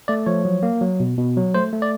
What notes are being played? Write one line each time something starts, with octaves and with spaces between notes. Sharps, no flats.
A3 D5
F3 C#5
F#3
A#3
F#3
B2
B2
F#3
A3 C5
A3
D5